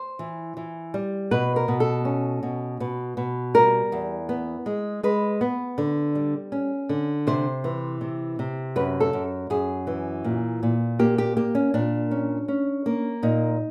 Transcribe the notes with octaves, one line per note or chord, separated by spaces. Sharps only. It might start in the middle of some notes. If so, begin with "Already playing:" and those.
Already playing: C5
E3
E3
G3
B2 B4
A#4
B2
A4
C#4
B2
B2
B2
G3 A#4
E2
B3
G#3
G#3 B4
B3
D3
G3
C#4
D3
C3 C5
E3
C3
C3
F#2 B4
A4
F#2
F#2 G#4
E3
A#2
A#2
A#3 G4
G4
A#3 G4
C#4
A#2 D4
C#4
C#4
A#3
A#2 D#4